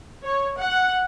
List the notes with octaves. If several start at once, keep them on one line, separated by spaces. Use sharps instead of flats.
C#5
F#5